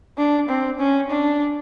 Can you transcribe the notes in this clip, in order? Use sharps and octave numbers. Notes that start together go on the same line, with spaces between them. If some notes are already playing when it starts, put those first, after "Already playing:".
D4
C4
C#4
D4